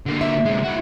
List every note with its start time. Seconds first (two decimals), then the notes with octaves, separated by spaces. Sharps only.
0.06 D3 A#3
0.21 E5
0.45 C3 G#3
0.64 E4 F#4